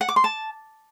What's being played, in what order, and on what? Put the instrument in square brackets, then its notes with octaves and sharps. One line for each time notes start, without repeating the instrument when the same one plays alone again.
[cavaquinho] F#5
D6
C6
A5